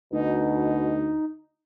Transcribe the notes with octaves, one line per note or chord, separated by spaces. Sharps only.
D2 B2 D#4